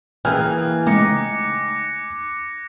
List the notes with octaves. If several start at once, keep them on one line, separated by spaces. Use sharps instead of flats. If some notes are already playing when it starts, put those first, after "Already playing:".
E3 A#3 G#4 G5 G#5 F6 F#6 G#6
C#3 G#3 A3 D#4 D6 A#6 C#7